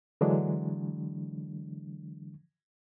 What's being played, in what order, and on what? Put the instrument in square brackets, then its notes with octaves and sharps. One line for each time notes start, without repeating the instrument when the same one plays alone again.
[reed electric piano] D3 E3 F#3 G#3 D4